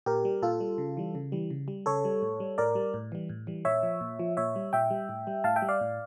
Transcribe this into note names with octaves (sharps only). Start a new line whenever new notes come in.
A#2 G4 A#4
G3
A#2 F4 A4
G3
C#3
E3 G3
C#3
E3 G3
C#3
G3
C#3 A4 C#5
G3
A2
G3
A2 A#4 D5
G3
A2
E3 G3
A2
E3 G3
A#2 C#5 E5
F3
A#2
F3
A#2 C#5 E5
G3
A#2 E5 G5
G3
A2
G3
A2 F5 A5
E5 G5
G3
D5 F5
A2